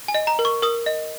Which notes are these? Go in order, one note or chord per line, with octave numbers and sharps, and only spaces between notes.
G#5
D#5
A#5
A#4
C#6
A#4 D#6
D#5